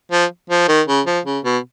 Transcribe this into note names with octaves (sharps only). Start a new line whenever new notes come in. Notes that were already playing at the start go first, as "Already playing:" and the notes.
F3
F3
D#3
C#3
F3
C#3
B2